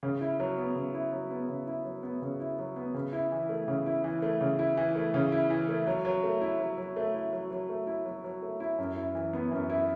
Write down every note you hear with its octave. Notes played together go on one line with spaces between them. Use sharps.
C#3
E4
F#3
B3
C#3
E4
F#3
B3
C#3
E4
F#3
B3
C#3
E4
F#3
B3
C#3
E4
E3
A3
C#3
E4
E3
A3
C#3
E4
E3
A3
C#3
E4
E3
A3
F#3
F#3
A3
E4
F#3
F#3
A3
E4
F#3
F#3
A3
E4
F#3
F#3
A3
E4
F#2
E4
E3
B3
F#2
E4